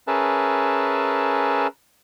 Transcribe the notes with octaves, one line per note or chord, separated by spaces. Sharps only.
C#4 G#4 A#4 B4 E5 A5